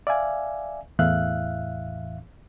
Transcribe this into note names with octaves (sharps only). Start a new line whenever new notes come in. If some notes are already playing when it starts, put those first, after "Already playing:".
D5 E5 F5 G#5
E2 A2 E3 E5 F5 F#6